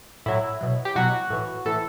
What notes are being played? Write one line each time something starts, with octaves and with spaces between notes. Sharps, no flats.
A2 F#3 E4
B2 F#3
G4
B2 F#3 F#4
A2 E3
A2 E3 A4